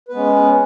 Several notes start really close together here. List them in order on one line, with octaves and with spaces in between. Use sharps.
B4 B3 G#3 C#4